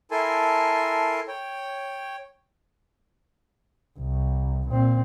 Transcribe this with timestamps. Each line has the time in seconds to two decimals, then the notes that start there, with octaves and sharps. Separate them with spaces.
0.11 E4 A4 A#4 G#5 A5 C6
1.28 C#5 G5
3.99 C2
4.70 A#2 C4